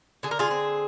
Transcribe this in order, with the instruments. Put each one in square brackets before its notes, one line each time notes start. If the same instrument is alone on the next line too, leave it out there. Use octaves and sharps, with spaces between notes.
[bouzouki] D3 G#4
A#4
F4 G#4
C4